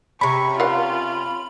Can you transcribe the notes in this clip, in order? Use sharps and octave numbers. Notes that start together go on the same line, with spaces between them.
C3 C#4 B5 C#6
F4 F5 F#5